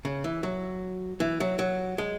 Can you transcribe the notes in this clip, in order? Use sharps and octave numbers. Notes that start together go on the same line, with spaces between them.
C#3
E3
F#3
E3
F#3
F#3
G#3